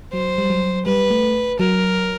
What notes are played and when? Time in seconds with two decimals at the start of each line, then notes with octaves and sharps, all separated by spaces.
0.13 F#3 C5
0.38 G3
0.50 F#3
0.86 G3 B4
1.10 A3
1.59 F#3 A#4